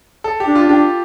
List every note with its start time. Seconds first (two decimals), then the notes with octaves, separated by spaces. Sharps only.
0.24 A4
0.40 G4
0.47 D4
0.55 F4
0.69 D4 G4